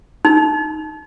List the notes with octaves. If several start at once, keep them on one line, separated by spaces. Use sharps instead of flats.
D#4